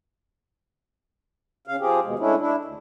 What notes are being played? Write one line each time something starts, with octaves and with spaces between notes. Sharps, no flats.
C#3 F5
F3 C4 G4 G#4
D#2 B2 G#3
G#3 A3 C#4 D4 E4
D4 E4
D2